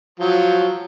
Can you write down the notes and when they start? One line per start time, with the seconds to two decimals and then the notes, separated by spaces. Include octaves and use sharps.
0.20 F3 F#3